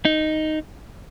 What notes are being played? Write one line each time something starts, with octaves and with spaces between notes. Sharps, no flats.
D#4